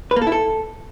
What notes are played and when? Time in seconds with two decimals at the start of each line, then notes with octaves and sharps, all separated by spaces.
0.11 B4
0.16 A#3
0.22 A4
0.27 E4
0.32 A4